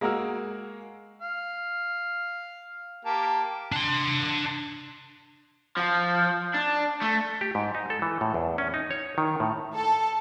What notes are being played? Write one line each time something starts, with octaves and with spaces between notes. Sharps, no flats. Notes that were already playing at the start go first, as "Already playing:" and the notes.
G#3 A#3 F#4 A#4 F#5 E6
F5
A#3 G4 A5
D4 C6
F3
D4
A3
G4
G#2
D#4
A4
E3
A2
E2
C#4
D#4
C#5
D#3
A2
A4